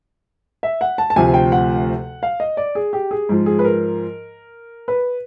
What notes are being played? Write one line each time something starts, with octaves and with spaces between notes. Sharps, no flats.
E5
F#5
A5
A5
D2 C3 F3 G#5
G5
F#5
F5
D#5
D5
G#4
G4
G#4
G#2 F3
G#4
B4
A#4
B4